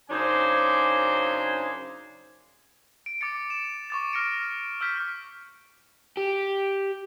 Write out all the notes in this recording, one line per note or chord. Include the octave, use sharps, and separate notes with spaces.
F#2 C#3 D4 D#4 C5 G#5
D7
D6 A6 C#7
E7
C#6 D6 A6
F6 A#6 C#7 D7
E6 F6 G6 B6
G4